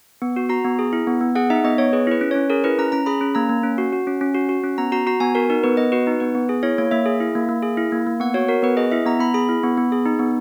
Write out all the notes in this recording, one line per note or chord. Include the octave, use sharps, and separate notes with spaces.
B3
F#4
F#4 A#5
B3
G#4
E4
B3
B3
G#4 F#5
D#4 E5
B3 D#5
B3 C#5
G#4 B4
E4 B4
C#4
C#4 C#5
G#4 A#4
E4 B4
C#4 A#5
C#4 A#5
G#4 B5
C#4
A#3 A#5
A#3
C#4
F#4
F#4
C#4
C#4
F#4
F#4
C#4
B3 A#5
F#4 A#5
F#4 A#5
B3 G#5
F#4 A#4
D#4 A#4
B3 B4
B3 D#5
F#4 B4
D#4
B3 B4
B3
G#4
E4 C#5
A#3 C#5
A#3 E5
G#4
E4
A#3
A#3
G#4
E4
A#3
A#3
B3 F#5
F#4 C#5
F#4 A#4
B3 B4
G#4 D#5
E4 E5
B3 A#5
B3 B5
G#4 B5
E4
B3
B3
G#4
D#4
B3